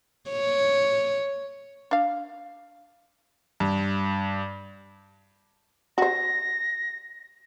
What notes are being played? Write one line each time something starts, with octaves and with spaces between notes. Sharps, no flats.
C#5
D4 F5
G2
F#4 C5 A#6